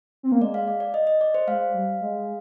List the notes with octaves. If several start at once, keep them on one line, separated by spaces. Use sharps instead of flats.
C4
A#3
G#3 D5
F5
D5
D5
D#5
D#5
D5
C5
G#3 F5
G3
G#3